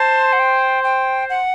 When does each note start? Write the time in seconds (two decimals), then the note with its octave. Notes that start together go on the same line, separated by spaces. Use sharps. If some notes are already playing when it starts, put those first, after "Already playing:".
Already playing: C5 A5
0.33 F#5
0.40 G5
0.84 G5
1.30 F#5